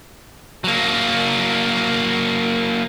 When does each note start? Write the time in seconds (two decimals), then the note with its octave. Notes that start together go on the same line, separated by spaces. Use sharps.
0.64 F#3 A#3